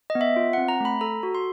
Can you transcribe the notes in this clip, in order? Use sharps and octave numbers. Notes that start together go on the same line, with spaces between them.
D#5
B3
E5
F4
F#5
C4
A#5
A3 B5
A4 A#5
F#4
C6